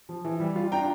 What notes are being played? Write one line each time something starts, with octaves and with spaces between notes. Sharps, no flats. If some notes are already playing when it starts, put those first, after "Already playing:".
F3
E3
G3
F4
D4 G5 A#5